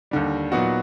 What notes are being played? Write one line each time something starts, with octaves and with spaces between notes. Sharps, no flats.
D#2 D3 G3
A#2 F#3 B3 D#4 F#4